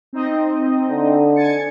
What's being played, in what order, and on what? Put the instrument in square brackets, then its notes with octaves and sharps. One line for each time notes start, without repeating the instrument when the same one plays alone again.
[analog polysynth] C4 D#4 D#5
[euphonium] D3
[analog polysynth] G#5 A6 C#7